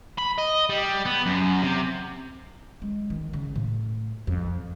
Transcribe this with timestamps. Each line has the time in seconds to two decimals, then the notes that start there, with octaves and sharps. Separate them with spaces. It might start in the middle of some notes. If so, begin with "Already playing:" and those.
0.18 B5
0.38 D#5
0.69 G3
1.05 B3
1.26 F#2
1.63 C3
2.82 G#3
3.10 D#3
3.33 C#3
3.56 A2
4.27 F2